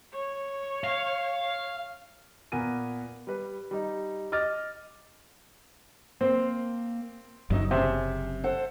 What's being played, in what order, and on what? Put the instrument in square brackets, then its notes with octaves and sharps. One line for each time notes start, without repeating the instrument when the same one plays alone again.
[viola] C#5
[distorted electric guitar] F5
[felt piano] A#2 B3 A#4 G#5 D#7
G3 B4
G3 D#4
D#5 D6 F6 A6
[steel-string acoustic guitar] A#3 [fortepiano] C4
[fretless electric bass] F#1 F#2 F#3 [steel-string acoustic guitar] D#4 D#5 E5
[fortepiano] C3 [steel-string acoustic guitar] C#4 G#4 A5
[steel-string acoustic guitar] A4 C5 F#5